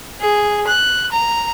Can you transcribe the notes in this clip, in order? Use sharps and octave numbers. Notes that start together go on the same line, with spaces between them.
G#4
F#6
A#5